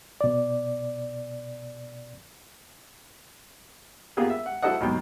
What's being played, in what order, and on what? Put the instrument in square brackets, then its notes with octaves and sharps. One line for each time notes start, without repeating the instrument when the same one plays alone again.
[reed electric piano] B2 D5
[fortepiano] A#3 B3 F4 G4 G#4 A#4
E5
F#5
E4 F#4 A4 C5 D#5 F#5
D#2 B2 F#3 G5